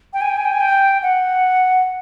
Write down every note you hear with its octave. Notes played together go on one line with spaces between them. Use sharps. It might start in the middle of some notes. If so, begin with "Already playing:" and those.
G5
G#5
G5
G#5
G5
G#5
G5
F#5